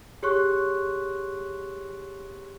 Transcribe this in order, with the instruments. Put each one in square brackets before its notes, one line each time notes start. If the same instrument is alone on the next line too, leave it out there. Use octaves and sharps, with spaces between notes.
[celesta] G4 G#4 C#5 C6 C#6 F#6